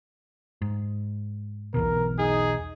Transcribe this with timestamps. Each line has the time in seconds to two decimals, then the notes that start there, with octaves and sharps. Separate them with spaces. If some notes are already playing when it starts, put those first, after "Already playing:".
0.62 G#2
1.74 B1 E2 B2 A#4
2.19 D#4 G#4